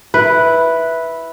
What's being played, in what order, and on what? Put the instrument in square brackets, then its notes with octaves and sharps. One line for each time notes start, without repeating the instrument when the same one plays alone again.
[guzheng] E4 [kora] B4